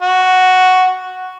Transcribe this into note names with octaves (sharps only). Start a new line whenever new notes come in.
F#4